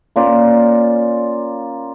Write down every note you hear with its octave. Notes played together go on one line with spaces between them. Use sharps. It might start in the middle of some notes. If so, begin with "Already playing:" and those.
A#3 C#4 F4 D5